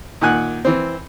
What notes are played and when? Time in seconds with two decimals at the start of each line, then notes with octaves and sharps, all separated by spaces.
0.21 A#2 D#3 F#5 G#5 F#6
0.65 E3 C4